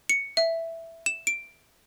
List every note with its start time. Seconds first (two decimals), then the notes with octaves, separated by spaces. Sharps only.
0.09 C#7
0.37 E5
1.06 E7
1.27 D7